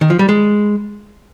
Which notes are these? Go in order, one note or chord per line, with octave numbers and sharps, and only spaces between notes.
D#3
F3
G3
G#3